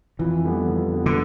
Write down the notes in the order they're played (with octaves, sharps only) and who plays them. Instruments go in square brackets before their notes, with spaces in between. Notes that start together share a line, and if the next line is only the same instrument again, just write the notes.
[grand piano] F2 [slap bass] E3
[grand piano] D3 G3 B3
F2
D3 G3 B3
[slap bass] D3